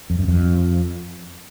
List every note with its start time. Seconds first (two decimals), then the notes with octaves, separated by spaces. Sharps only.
0.10 F2
0.19 F#2
0.28 F2